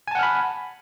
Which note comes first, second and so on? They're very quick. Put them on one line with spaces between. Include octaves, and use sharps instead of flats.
G#5 A5 F#5 F6 B5